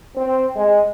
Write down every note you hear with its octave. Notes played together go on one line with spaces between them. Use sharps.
C4
G#3